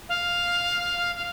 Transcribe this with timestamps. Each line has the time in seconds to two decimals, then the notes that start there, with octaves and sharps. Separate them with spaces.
0.09 F5
1.15 F5